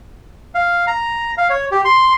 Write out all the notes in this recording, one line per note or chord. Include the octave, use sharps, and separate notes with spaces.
F5
A#5
F5
C#5
G4
C6